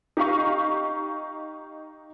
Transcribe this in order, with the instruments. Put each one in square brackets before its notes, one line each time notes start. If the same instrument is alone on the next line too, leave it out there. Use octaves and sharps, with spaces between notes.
[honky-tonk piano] D#4 G4 D#5 F5 C#6